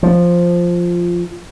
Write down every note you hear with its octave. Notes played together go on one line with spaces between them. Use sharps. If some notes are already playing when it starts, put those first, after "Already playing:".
F3